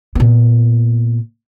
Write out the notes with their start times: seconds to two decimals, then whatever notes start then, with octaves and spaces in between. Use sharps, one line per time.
0.15 A#2 B3